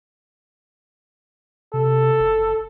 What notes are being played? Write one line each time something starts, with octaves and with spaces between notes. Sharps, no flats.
C3 A4
F#1